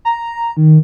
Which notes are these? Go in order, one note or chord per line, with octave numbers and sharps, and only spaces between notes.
A#5
D#3